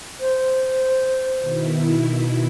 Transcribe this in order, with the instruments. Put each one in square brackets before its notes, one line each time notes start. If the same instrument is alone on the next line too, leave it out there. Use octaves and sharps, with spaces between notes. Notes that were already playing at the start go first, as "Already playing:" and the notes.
[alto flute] C5
[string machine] B2 D#3 E4